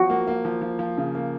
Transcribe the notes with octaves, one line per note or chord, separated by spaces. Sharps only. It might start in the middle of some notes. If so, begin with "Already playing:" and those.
Already playing: F3 F#4
A#3
A#3
F3
F3
F3
C#3
A#3